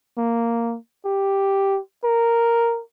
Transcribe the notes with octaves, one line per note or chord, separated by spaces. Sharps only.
A#3
G4
A#4